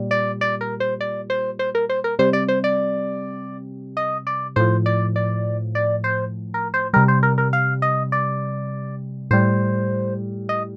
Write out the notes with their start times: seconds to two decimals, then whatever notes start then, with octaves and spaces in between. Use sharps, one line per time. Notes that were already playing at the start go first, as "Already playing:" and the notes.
Already playing: A#2 G3
0.11 D5
0.41 D5
0.61 A#4
0.80 C5
1.01 D5
1.30 C5
1.59 C5
1.75 A#4
1.89 C5
2.04 A#4
2.19 C3 G3 C5
2.33 D5
2.48 C5
2.64 D5
3.97 D#5
4.27 D5
4.56 A2 F3 C5
4.86 D5
5.16 D5
5.75 D5
6.04 C5
6.54 A#4
6.74 C5
6.93 C3 G3 A#4
7.08 C5
7.23 A#4
7.38 A#4
7.53 F5
7.82 D#5
8.12 D5
9.30 A2 G3 C5
10.49 D#5